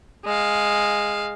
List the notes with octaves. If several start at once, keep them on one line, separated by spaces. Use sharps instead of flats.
G#3 F5